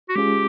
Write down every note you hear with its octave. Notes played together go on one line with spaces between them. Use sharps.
F#4
G#3 C#4 F4 G4 G#4